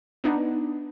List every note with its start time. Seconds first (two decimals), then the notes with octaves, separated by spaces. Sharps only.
0.24 B3 D4 D#4